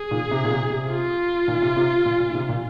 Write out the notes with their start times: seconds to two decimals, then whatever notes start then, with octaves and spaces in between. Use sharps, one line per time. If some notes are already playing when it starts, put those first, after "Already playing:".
Already playing: G#4
0.11 A#2 D#3
0.27 D#3
0.31 C3
0.44 A#2
0.51 C3
0.70 C3
0.89 F4
1.47 A#2 D#3
1.62 C3
1.76 C3
2.05 A#2
2.20 A#2
2.30 D#3
2.34 C3
2.49 A#2